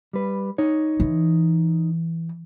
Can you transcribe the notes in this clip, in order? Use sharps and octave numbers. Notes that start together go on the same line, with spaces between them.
G3 B4
D#4 C#5
E3